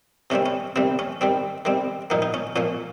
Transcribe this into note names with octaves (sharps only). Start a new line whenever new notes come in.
C3 D#3 G3 C4 C#4
C#4
C3 D#3 G3 C4
C#4
D#3 G3 C4
D#3 G3 C4
A#2 D#3 F3 A#3 D#4
D#4
C#4
A#2 F3 A#3 C#4